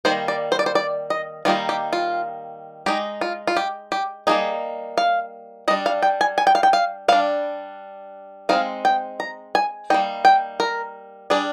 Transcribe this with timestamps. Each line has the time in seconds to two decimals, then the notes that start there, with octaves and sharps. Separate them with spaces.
0.05 D#3 G3 A#3 C5
0.28 D5
0.52 C5
0.59 D5
0.66 C5
0.75 D5
1.10 D#5
1.45 D#3 G3 A#3 D#4 F4
1.69 G4
1.93 F4
2.86 G#3 D#4 G4
3.21 F4
3.47 F4
3.57 G4
3.92 G4
4.27 G3 A#3 D#4 G#4
4.97 F5
5.68 G3 D#5
5.71 D4
5.86 F5
6.02 G5
6.21 G#5
6.38 G#5
6.47 G5
6.55 F5
6.63 G5
6.73 F5
7.08 G3 D4 F5
8.49 G#3 C4 D#4 F5
8.85 G5
9.20 A#5
9.55 G#5
9.90 G3 A#3 D#4 G5
10.25 G5
10.60 A#4
11.30 G3 D4 G#4